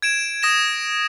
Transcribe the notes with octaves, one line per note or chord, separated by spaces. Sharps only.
G#6 D7 E7
D#6 A#6 E7